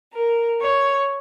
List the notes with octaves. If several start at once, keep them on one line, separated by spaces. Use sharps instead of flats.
A#4
C#5